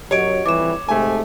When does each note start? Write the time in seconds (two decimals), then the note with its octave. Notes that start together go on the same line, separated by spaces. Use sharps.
0.11 F#2 F#3 G4 C#5 D#5 D7
0.46 F2 E3 G3 D6 E7
0.89 G#2 C3 A3 G#5